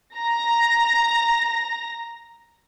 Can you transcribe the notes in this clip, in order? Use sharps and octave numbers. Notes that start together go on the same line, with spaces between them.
A#5 A#6